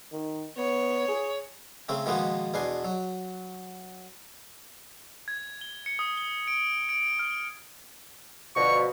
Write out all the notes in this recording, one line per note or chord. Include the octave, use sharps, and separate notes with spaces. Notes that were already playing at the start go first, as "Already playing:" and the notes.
D#3
B3 C#5
G#4
C#3 A3 C4 C#4
B2 D#3 F3 G#3 A#3 B3
E2 B2 D4 G#5 C6
F#3
G#6
G7
C#7
D#6
G7
D7
D7
F6
B2 D3 F3 C#6